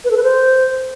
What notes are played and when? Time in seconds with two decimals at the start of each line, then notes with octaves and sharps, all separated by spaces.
0.05 B4
0.11 A4
0.17 B4
0.23 C5